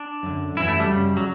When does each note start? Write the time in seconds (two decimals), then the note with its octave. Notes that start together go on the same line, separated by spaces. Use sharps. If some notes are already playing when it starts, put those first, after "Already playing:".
Already playing: D4
0.23 F#2 D3
0.57 F#2 E3 E4
0.68 A3
0.80 G3
0.90 F#2 C#3
1.17 F#3